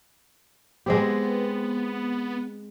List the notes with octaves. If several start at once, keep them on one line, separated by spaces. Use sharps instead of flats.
G#3 B3 C4 G4